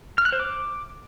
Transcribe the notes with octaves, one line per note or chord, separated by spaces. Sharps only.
F6
F#6
C5
D6